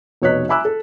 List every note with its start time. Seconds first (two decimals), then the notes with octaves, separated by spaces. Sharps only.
0.22 F1 B2 C#5 D#5 F#6 B6
0.49 E5 G#5 B5 D6 E6 F#6
0.65 A4